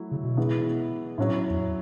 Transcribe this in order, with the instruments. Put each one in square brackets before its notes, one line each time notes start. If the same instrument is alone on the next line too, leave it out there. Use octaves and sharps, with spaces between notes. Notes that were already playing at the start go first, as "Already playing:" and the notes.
Already playing: [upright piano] F#3 A3 E4
[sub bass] C#3
B2
[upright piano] E3 G#3 B3 E4
[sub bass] A2 [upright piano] F#3 C#4 E4
[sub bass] E2